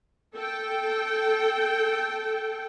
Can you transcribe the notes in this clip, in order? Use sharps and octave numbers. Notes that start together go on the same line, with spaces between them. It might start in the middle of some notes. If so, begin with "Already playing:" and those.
A4 G5